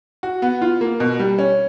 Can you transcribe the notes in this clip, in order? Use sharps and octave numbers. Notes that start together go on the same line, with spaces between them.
F#4
B3
F4
A#3
B2
G3
C#4